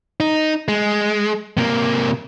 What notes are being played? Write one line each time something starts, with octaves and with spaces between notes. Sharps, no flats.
D#4
G#3
C3 A#3